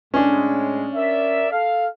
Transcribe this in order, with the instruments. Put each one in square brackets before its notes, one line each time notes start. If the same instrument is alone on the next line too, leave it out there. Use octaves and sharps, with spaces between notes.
[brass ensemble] A2 G#3 [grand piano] C#4 D4
[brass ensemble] A#4 D5 E5
A4 F5